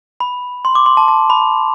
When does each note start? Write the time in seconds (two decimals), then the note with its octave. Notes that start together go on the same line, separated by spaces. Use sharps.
0.20 B5
0.65 C6
0.75 D6
0.86 C6
0.97 A5
1.08 A5
1.30 B5